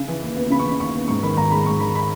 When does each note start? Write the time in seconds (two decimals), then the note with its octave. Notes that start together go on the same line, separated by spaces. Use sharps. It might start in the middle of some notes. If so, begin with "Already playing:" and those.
Already playing: C#3
0.08 E3
0.22 D#2
0.37 B3
0.50 C#3 B5
0.59 C#6
0.65 E3 B5
0.80 D#2 C#6
0.95 B3
1.08 G#2 C#6
1.23 D#3 B5
1.37 G#1 A#5
1.51 G#3 B5
1.66 G#2 C#6
1.80 D#3 B5
1.95 B5